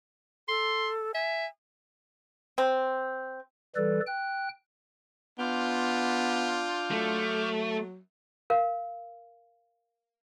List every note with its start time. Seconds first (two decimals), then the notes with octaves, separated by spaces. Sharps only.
0.48 A4 C6
1.14 E5 G#5
2.58 C4
3.76 E3 G3 A4 B4 D5
4.07 G5 F#6
5.39 B3 D4 F4 D6 F6 G6
6.91 F#3 A3
8.50 A#4 F5